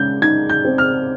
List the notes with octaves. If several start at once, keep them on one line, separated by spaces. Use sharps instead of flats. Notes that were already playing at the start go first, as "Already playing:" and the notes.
Already playing: C#3 G#3 G6
D#4 G#6
G6
C4
F6